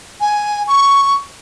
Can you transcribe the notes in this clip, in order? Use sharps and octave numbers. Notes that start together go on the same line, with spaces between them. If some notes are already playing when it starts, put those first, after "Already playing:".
G#5
C#6